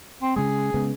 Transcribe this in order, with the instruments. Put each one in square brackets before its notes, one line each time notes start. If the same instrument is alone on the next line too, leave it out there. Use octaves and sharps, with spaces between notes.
[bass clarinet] C4
[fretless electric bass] C#3 G#3 [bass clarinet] G#4
[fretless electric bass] C#3 G#3 B3